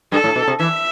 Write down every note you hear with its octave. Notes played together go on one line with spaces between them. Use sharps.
G2 A4
A2
B2
C3
E3 E5